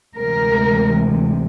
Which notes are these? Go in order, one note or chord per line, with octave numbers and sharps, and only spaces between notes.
D2 C3 E3 G#3 A#4